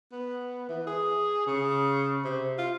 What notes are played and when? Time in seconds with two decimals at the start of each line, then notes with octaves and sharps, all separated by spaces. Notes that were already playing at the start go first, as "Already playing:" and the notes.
0.12 B3
0.69 E3
0.87 G#4
1.47 C#3
2.25 C3
2.58 F4